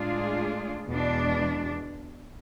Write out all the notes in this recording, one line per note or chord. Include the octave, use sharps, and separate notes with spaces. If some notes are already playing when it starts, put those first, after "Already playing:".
Already playing: A2 G#3 D4 F4 G#4
E2 B2 G#3 D4